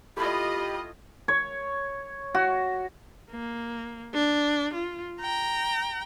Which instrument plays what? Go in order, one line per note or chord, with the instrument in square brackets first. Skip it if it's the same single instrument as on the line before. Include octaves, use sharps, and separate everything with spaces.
[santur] A3 E4 [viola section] F4 D#5 [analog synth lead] G4 [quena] B5
[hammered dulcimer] C#5
F#4
[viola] A#3
D4
F4
G5 A#5